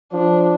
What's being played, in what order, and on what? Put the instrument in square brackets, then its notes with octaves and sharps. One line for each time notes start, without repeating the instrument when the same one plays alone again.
[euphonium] F3 [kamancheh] D4